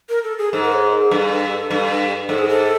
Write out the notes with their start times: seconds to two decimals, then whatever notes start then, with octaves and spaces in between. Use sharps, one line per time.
0.09 A#4
0.24 A4
0.38 G#4
0.53 G#2 A4
0.63 A#4
0.73 C#5
0.82 C5
0.92 A#4
1.02 G#4
1.11 G2 A4
1.71 G2
2.29 G#2 A4
2.39 G#4
2.49 A4